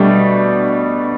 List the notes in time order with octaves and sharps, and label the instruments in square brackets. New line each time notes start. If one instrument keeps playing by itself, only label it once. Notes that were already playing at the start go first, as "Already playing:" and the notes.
Already playing: [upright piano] B2 A3 D4 [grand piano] G3